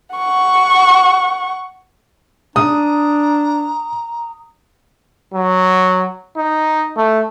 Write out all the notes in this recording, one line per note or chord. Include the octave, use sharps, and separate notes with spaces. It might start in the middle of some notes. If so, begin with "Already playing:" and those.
F#5 C#6
D4 A#5 D#6
F#3
D#4
A3